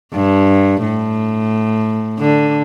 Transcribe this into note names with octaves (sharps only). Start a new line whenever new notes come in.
G2
A2
D3